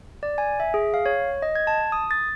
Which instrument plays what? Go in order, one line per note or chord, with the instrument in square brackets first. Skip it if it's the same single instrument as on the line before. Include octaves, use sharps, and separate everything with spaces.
[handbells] D5
G#5
E5
G#4
F5
C#5
D#5
G#6
A5
D#6
A6